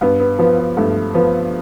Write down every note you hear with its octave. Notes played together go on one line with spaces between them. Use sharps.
G2 B3
B3
F3 B3
B3
G2 A3
F3 B3